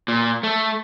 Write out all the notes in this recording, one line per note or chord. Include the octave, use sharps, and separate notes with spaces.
A#2
A3